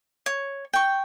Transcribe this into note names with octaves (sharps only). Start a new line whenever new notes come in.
C#5
G5 C#6